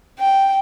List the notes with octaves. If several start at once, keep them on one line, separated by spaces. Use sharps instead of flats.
G5